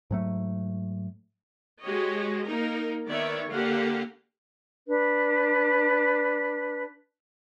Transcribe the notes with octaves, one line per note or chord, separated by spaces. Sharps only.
G#2 F#3 A3
G#3 F#4 G4 C#5 D#5
A#3 D#4 A#4
D#3 B3 A#4 C#5 D5 E5
D3 A#3 G4 F5 F#5
D4 B4